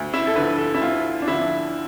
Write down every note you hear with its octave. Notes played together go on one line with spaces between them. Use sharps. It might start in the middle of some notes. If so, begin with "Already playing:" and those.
Already playing: D2
E4
A4
D3 F3 B4
A4
E4
D2 F4
D4
D3 F3 E4